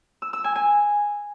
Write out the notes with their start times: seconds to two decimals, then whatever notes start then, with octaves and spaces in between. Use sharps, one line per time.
0.22 E6
0.33 E6
0.44 G#5
0.56 G#5